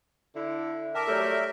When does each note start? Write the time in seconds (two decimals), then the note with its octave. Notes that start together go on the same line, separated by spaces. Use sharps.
0.35 D3 E4
0.95 A#4 E5 G5 A5 D6
1.07 F#3 G3 A3 A4 C#5 D5